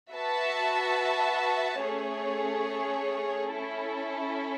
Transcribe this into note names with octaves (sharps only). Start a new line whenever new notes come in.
F#4 B4 E5 A5
A3 C#4 G#4 C#5
C#4 E4 A4